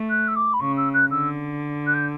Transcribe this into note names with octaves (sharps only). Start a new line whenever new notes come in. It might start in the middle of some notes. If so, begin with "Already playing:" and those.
Already playing: A3
F#6
E6
D6
B5
C#3 C#6
E6
F#6
D3 E6
F#6
G6